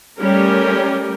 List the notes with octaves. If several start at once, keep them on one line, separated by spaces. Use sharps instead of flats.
G3 A3 C#4 G4 A#4